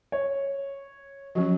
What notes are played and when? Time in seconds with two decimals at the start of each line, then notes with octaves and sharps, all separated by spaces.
0.12 C#5
1.35 F3 F#3 C#4